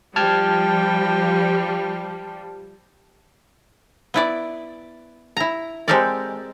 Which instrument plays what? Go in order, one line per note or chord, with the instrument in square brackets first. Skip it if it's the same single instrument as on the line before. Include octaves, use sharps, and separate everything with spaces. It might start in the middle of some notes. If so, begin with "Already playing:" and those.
[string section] F3 G3 [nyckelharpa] G5 [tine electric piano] A5 F6 G#6
[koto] B3 E4 D5
E4 A#5
G#3 C4 G4 A4 A#4 D5